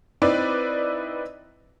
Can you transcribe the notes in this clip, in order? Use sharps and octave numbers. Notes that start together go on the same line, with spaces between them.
C4 D#4 E4 B4 D5